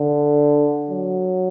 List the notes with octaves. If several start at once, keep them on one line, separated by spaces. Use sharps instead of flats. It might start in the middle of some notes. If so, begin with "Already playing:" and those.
Already playing: D3
F#3